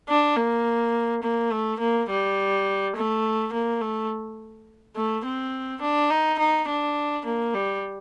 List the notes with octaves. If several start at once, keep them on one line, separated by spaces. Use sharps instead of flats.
D4
A#3
A#3
A3
A#3
G3
A3
A#3
A3
A3
C4
D4
D#4
D#4
D4
A#3
G3